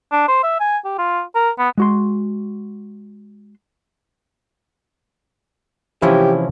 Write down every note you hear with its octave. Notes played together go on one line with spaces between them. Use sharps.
D4
C5
E5
G#5
G4
F4
A#4
B3
G#3 F#4 C6
C3 E3 F3 G#3 C#4 E4 G4